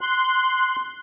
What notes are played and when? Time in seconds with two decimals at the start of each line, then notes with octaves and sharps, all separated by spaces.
0.01 C6 F#6